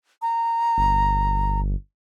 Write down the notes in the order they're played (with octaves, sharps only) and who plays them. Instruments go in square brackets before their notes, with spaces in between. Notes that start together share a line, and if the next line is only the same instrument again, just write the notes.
[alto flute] A#5
[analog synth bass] G1